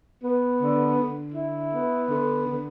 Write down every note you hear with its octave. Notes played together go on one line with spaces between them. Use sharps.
B3
D3
D3
E4
B3
D3
D3